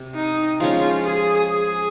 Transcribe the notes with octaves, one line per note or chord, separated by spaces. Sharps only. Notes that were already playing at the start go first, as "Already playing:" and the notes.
Already playing: C3
D#4
F3 G#3 C#4 F4
G#4
G#4